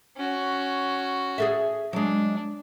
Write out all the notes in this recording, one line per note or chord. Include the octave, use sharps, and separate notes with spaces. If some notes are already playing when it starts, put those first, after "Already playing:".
C#4 F#4
G#4 A4 E5
F#3 G#3 D4